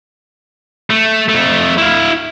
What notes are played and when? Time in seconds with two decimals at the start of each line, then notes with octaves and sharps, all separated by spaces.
0.90 A3
1.29 F2 A3
1.78 E4 F5